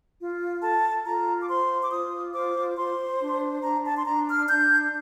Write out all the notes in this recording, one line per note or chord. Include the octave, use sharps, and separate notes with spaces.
F4
A4 A5
F4 A#5
D6
C5 C6
D6
F4 D#6
C5 D6
C5 C6
D4
D4 A#5
A5
C6
D4 A#5
F6
D4 G6